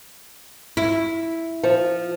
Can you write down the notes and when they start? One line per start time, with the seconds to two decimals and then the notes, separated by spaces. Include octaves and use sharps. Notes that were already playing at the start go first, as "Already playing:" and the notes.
0.77 E4
1.63 F3